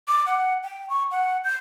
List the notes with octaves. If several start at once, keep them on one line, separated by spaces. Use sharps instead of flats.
D6
F#5
G5
C#6
F#5
G6